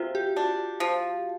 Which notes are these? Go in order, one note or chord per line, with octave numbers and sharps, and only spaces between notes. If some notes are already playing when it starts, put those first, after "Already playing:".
Already playing: C3 F4 F#4
G4
D4
F3